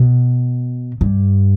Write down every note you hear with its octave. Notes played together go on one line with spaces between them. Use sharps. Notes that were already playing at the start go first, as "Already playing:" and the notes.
Already playing: B2
G2